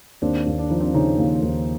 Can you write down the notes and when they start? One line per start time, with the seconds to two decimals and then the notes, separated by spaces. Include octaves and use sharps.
0.22 D#2 C4 D4
0.46 D#2
0.59 D4
0.70 F3 D#4
0.80 C4 D4
0.94 C#3 C#4 D#4
1.18 D#2
1.42 D#2